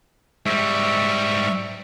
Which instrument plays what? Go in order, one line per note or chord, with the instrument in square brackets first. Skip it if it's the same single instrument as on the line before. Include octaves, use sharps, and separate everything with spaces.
[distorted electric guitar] G#2 G3 [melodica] E5 C#6